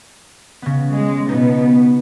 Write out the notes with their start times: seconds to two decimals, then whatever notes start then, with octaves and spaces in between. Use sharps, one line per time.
0.62 C#3 B3
0.92 G#3
1.29 B2 B3 D#4